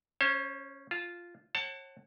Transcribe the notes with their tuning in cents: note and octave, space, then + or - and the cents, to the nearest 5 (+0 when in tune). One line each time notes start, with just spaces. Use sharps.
C#4 +0 C5 +35
F4 -5 A5 +0
C#5 -40 F#5 +20 A5 +20